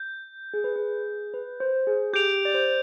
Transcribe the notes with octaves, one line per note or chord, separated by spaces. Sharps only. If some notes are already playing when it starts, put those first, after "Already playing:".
Already playing: G6
G#4
B4
G#4
B4
C5
G#4
G4 G6 D7 F7
D5
C5